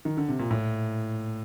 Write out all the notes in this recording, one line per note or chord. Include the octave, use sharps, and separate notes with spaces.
D#3
D3
C3
A#2
A2